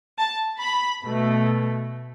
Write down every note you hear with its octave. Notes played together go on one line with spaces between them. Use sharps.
A5
B5
B2 A3